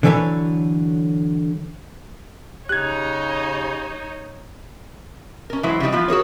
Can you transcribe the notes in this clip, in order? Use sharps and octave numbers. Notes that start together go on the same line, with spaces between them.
D3 E3 F#3 A4 B4 C#5
C#3 D#4 G4 C#5 F#6 G#6
C#4 A#4
E3 F#3 G#3 E4 C5
C#3 E3 G3 D#4
E3 F3 B3 F4
F#4 G#4 A#4 C#5